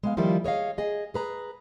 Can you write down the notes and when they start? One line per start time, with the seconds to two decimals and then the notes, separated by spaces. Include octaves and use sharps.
0.03 G#3 B3 F5
0.17 D#3 F3 G3 A#3 E4 F4
0.44 G#4 C#5 D#5 F5
0.78 G#4 D#5
1.14 G#4 B4 A#5